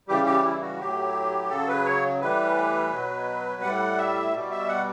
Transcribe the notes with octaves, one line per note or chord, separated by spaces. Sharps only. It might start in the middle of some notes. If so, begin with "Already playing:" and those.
C#3 E3 G3 G4
G4
E4
F#4
A2 F#3 G4
C#3 F#3 A4
B4
C#5
A2 E3 G3 B4
B2 F#3
A2 G3 F#5
E5
B2 G3
E5
F#5